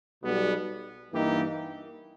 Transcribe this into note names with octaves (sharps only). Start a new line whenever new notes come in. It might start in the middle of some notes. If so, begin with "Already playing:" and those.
B1 B2 G3 B3
G2 E3 A#3 D#4 G4